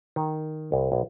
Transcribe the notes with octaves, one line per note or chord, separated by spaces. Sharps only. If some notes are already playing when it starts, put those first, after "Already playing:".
D#3
C2
B1